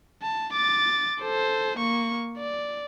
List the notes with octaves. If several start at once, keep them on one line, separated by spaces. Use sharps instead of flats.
A5
D6 A6
A4 C5
A#3 C#6
D5